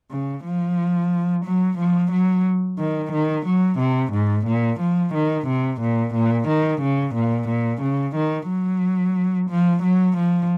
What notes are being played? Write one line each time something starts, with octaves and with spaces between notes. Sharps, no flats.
C#3
F3
F#3
F3
F#3
D#3
D#3
F#3
C3
G#2
A#2
F3
D#3
C3
A#2
A#2
D#3
C#3
A#2
A#2
C#3
D#3
F#3
F3
F#3
F3